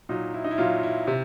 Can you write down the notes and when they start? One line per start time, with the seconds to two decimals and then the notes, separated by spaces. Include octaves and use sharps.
0.09 A#2 F#3 D#4
0.34 E4
0.44 D#4
0.51 E4
0.58 A#2 F#3 F4
0.83 E4
1.07 C3